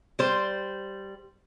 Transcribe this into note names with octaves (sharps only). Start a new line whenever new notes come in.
G3 C5